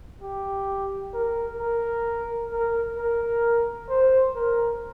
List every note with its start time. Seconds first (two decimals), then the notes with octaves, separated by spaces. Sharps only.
0.22 G4
1.14 A#4
1.60 A#4
2.52 A#4
2.98 A#4
3.89 C5
4.36 A#4